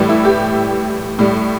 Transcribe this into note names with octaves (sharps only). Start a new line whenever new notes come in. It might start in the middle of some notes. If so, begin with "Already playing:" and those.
Already playing: A2 E3 G3
E4
G4
A2 G3